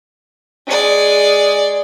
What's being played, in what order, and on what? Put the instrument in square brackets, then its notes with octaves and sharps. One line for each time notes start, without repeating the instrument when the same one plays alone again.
[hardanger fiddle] G#3 D5